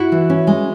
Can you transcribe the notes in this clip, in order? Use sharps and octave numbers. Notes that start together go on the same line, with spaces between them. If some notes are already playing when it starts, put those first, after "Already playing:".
Already playing: E4 F#4
E3
C#4
G#3